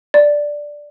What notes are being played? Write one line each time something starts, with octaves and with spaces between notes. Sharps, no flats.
D5